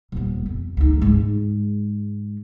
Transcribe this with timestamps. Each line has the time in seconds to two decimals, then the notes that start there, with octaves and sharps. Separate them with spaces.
0.12 D#1 B3
0.46 F2
0.77 D2 D#4
1.02 G#2 G#3